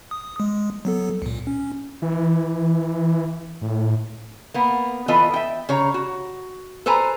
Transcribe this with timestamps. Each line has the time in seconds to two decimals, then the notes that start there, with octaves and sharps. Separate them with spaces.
0.11 D#6
0.40 G#3
0.85 F#3 B3 A4
1.22 C#2 A#2
1.47 C#4
2.02 E3
3.61 A2
4.54 A#3 B3
5.08 E3 B3 F4 A4 B4 D#5
5.34 E5 G5
5.69 C#3 C#5 A#5
5.94 F#4
6.86 A4 B4 C5 G#5 A#5